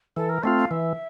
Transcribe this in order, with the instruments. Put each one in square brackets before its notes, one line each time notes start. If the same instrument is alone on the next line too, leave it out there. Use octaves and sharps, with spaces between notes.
[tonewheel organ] E3 [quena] A4
[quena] A#4
[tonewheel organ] A3 C4 F4 [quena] F5
[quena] F5
[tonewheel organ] E3 [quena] E5